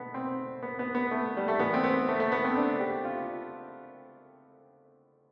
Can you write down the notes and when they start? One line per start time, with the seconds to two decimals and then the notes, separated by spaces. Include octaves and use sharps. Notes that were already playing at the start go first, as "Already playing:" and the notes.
Already playing: B2 A3 B3
0.14 C4
0.63 B3
0.79 B3
0.95 B3
1.11 A3
1.37 G3
1.48 A3
1.59 A2 E3 B3
1.74 C4
1.84 B3
2.08 A3
2.20 A3
2.32 B3
2.44 C4
2.56 D4
2.80 G4
3.05 F4